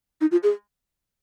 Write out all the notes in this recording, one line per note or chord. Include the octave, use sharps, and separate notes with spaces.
D#4
F4
G#4